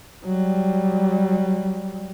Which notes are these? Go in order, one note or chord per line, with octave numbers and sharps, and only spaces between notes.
F#3 G3